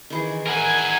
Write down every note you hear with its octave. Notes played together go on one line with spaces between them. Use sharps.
D#3 E3 G#4
A#4 F#5 G#5